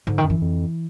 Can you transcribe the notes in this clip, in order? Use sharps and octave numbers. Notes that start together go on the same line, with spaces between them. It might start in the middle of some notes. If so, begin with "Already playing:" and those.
G#2 D3
D#3
F#2
E3
F2